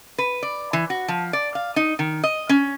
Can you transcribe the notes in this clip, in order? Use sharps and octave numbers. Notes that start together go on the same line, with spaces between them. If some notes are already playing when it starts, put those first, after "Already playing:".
B4
D5
E3
F#4
F3
D5
F5
D#4
D#3
D#5
C#4